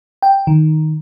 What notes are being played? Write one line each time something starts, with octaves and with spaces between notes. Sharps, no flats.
G5
D#3